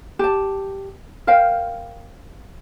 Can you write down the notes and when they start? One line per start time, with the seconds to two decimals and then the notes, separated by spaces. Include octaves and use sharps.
0.19 G4 A5
1.27 A#4 C5 F5 G5